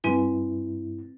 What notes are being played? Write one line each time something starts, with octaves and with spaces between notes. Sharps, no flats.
G2 C4 E4 B4 G#5